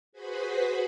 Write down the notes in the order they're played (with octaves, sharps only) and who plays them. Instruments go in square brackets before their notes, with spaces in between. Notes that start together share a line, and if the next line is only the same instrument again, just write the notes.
[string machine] F#4 G#4 B4 C5 B5